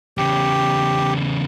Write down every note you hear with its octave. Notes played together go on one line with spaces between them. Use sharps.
E2 C#3 G4